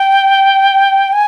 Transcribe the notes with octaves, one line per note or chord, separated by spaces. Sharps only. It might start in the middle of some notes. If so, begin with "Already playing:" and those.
Already playing: G5
G#5